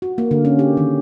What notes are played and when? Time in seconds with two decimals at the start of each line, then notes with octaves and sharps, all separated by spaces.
0.02 F#4
0.18 A#3
0.31 D3
0.45 C#4
0.59 G4
0.77 D#3